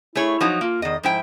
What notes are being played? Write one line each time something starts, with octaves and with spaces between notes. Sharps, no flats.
A3 E4 G#4 C#5
F3 F#3 D#4
A#3 F4
E2 D#3 D#5
G#2 F3 E4 G5